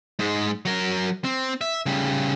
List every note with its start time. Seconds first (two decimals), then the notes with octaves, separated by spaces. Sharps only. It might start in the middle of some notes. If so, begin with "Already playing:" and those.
0.19 G#2 G#3
0.65 F#3 A#4
1.24 C4
1.61 E5
1.86 C#3 G3